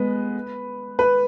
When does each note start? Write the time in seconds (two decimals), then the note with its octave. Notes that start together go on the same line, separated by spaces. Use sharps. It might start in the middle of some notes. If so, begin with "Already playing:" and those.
Already playing: G#3 B3 B4
0.99 B4